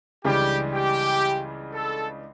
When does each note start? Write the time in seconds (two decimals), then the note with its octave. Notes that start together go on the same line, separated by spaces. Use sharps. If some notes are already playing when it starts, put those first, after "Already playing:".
0.25 C#2 C#3 E3 G3 D4 G4
0.74 G4
1.73 A4